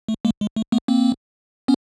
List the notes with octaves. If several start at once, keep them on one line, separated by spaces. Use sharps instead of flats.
A3
G#3 A#3
G#3
A3
A3 B3
A#3 C4
B3 C#4